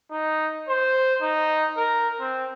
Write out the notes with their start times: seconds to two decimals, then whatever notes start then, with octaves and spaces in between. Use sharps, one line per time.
0.11 D#4
0.69 C5
1.21 D#4
1.77 A#4
2.20 C4